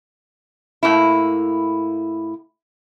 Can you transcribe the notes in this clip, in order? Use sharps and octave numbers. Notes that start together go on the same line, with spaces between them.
A2 A#3 E4